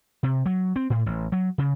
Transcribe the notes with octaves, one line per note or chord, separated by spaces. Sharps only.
C3
F#3
C4
A2
A1
F#3
C#3